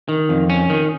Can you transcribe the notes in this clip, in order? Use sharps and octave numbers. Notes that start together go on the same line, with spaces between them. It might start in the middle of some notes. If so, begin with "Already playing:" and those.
D#3
F2
C#4
D#3